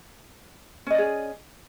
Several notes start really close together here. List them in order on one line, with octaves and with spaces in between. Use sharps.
C#4 D#5 D5 G#4